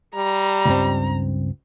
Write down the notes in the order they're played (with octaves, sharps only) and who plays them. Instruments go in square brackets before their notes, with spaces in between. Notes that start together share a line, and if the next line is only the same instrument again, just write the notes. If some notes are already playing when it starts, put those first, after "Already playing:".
[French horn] G3 [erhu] A#5
[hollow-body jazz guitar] C#2 G2 C4